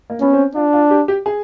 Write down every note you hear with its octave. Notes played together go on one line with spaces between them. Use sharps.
A#3
B3 C#4
C4
D4 F4
F4
G4
G4
G#4